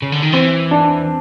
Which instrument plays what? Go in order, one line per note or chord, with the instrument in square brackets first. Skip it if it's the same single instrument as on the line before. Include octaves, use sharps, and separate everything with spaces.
[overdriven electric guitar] C#3
D3
D#3
[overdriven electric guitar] E3 [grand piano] C4
[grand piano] D4